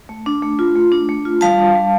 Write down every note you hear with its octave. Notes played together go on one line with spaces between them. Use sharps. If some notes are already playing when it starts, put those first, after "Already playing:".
A3
D4
A3
F4
A3
D4
A3
F4
G3 F5 A5
D4
G3